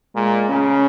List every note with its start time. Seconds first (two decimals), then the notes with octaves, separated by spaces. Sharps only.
0.15 A#2 G#3
0.49 C#3 C#4